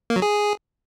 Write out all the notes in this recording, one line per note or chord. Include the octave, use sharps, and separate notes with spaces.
A#3
F#3
G#4